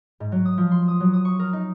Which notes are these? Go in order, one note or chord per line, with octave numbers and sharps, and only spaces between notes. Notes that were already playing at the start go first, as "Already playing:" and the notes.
G#2
F#3
D#6
F3
C6
D#6
F#3
D#6
C#6
A#4
D#4